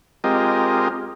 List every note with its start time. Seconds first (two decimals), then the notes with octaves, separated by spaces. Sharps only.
0.24 G#3 C4 F4 G4 A#4 D#5